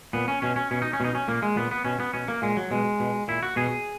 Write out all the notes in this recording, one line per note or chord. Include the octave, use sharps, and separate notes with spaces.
A#2 B3
C#4
B2 C#4
C#4
B2 C#4
D#4
C#4
B2 D#4
C#4
A#2 A#3
G#3
A#2 B3
B3
B2 C#4
B3
B2 C#4
A#3
A#2 G#3
F#3
B2 G#3
B2
A#2 E4
F#4
B2 G#4